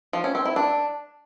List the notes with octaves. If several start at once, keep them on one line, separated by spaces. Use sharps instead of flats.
F3
C#4
C4
E4
D4